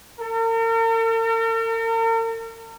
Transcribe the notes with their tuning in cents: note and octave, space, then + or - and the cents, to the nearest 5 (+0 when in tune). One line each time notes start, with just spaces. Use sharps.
A#4 -45